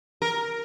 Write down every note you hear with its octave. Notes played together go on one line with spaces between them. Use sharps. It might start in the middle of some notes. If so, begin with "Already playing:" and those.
A#4